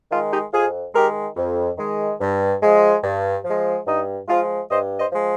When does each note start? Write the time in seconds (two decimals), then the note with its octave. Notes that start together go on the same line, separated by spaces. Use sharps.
0.11 D#3 F4
0.14 G#3
0.31 D#4 G4
0.53 F2 F4 G#4
0.94 D#3 G#3 G4 A#4
1.36 F2
1.78 D#3 G#3
2.20 G2
2.62 F3 G#3
3.03 G2
3.44 F3
3.50 G#3
3.87 G2 D#4
4.28 F3 G#3 F4
4.70 G2 C5 D#5
4.98 C5 D#5
5.12 F3 G#3